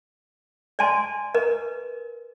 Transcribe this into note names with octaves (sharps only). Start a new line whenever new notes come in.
D5 D#5 G#5 A5 C6
A#4 B4 D#5